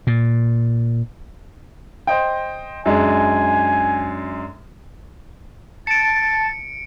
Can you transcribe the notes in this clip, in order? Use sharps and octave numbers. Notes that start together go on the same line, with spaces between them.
A#2
C5 D#5 G5
F#2 G#3 D4 G#5
A5 A6 C#7 D7